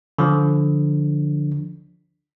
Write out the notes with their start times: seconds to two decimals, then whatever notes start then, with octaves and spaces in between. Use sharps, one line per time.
0.18 D3 F3 D4